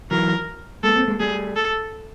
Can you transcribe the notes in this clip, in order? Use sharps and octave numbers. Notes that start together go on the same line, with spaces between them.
E3 F#3 A#4
G#3 A#3 A4
A#3 C4
G#3 A#3
G3 A3 G#4
A4